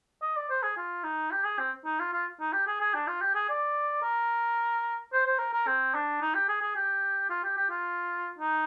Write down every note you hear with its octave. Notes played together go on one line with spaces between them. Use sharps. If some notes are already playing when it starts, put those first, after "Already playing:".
D#5
D5
C5
G#4
F4
D#4
G4
G#4
C4
D#4
F4
F4
D#4
G4
G#4
G#4
D4
F4
G4
G#4
D5
A#4
C5
C5
A#4
A#4
C4
D4
D#4
G4
G#4
G#4
G4
F4
G4
G4
F4
D#4